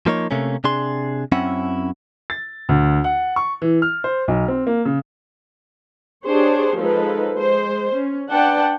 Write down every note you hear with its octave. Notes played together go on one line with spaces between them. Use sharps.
F3 A#3 D#4 C#5
C3 A3 A#3 C#4
C3 D4 G#4 C6
F#2 C4 C#4 E4 F#5
A6
D2
F#5
C#6
E3
F6
C5
B1
C4
A#3
C#3
D4 G4 G#4 C5 C#5
F3 G#3 D#4 A4 B4
G#3 C5
C#4
D4 B4 D5 F#5 G5 A5